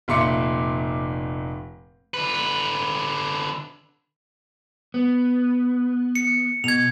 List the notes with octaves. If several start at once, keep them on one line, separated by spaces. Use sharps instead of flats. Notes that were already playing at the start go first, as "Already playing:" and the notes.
F1 A#2 E5 C6 D6 C#7
D3 B4
B3
C#7
B2 G#6 F7